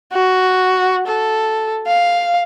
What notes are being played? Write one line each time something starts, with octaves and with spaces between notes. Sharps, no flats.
F#4
A4
F5